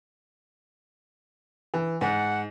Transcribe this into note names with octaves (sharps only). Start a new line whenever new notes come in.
E3
G#2 F#5